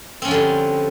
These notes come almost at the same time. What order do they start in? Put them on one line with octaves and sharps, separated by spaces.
C4 C#4 F3 D3 G3